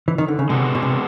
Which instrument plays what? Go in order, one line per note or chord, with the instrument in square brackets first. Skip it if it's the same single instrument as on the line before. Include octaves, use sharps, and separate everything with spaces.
[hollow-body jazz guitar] E3
D#3
D3
C#3
[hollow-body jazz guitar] C3 [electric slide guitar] G#3 B3 D4 F#4
[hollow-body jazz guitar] B2
C3